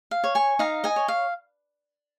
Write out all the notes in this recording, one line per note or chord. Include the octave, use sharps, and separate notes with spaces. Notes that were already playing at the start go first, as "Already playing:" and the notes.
F5
C#5
G#5 C#6
D#4 F5 A#5
D#5 G#5
C#5
F5